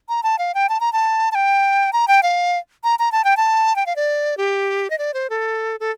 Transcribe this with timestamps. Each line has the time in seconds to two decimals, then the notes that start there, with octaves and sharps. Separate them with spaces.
0.09 A#5
0.23 A5
0.38 F5
0.54 G5
0.69 A5
0.80 A#5
0.93 A5
1.32 A5
1.35 G5
1.93 A#5
2.08 G5
2.23 F5
2.84 A#5
2.99 A#5
3.12 A5
3.24 G5
3.37 A5
3.76 G5
3.86 F5
3.96 D5
4.37 G4
4.90 D#5
4.98 D5
5.14 C5
5.30 A4
5.80 A4